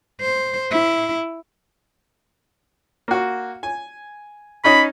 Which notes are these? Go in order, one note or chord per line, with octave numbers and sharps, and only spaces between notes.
C5
E4
A#3 F#4
G#5
C#4 D#4 D#5 B5